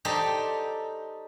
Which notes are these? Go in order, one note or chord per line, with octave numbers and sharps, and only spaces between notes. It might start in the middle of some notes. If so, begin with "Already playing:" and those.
D#4 G4 A4 C5 D5